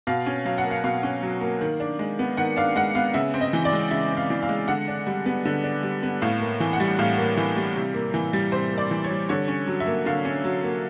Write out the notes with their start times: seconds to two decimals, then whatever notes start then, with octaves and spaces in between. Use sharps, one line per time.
0.07 B2 F5
0.26 C#4
0.45 F#3 F5
0.58 F#5
0.64 A#3
0.71 F5
0.84 B2 F5
1.03 C#4
1.23 F#3
1.41 A#3
1.61 D#3
1.80 D4
1.99 G#3
2.19 B3
2.37 D#3 F#5
2.56 D4 F5
2.76 G#3 F#5
2.95 B3 F5
3.14 C#3 E5
3.34 C4
3.41 D#5
3.53 E3
3.65 D5
3.72 G#3
3.91 C#3 E5
4.10 C4
4.17 F5
4.30 E3
4.43 F5
4.49 G#3
4.68 D3 F#5
4.88 D4
5.07 G3
5.26 B3
5.45 D3
5.64 D4
5.83 G3
6.03 B3
6.22 A2 F5
6.41 A#3
6.60 E3
6.73 F#5
6.80 G3
6.99 A2 F5
7.18 A#3
7.37 E3
7.56 G3
7.76 C3
7.94 A#3
8.14 E3
8.33 G3
8.52 C3 C5
8.71 A#3
8.78 D5
8.91 E3
9.04 C#5
9.11 G3
9.29 D3 C#5
9.48 C#4
9.67 F#3
9.80 E5
9.87 A#3
10.06 D3 F5
10.25 C#4
10.44 F#3
10.64 A#3